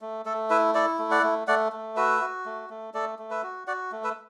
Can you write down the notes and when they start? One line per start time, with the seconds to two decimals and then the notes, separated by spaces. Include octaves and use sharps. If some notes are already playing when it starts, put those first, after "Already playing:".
0.01 A3
0.26 A3 A4
0.50 E4 B4 E5
0.75 E4 A4 D5
0.99 A3
1.11 D5 F#5
1.23 A3
1.47 A3 D5 F#5
1.72 A3
1.96 F#4 B4 E5
2.21 F#4
2.46 A3
2.70 A3
2.94 A3 A4 D5
3.19 A3
3.31 B4 E5
3.43 F#4
3.67 F#4 D5 F#5
3.92 A3
4.04 B4 E5